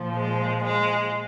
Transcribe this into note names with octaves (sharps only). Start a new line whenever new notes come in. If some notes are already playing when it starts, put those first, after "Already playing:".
Already playing: A#2 F3
G#3
G#3